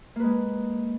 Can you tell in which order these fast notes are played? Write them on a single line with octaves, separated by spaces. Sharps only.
A#3 B4 G#3